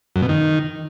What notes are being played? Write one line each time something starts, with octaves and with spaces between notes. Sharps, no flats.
F#2
B2
D#3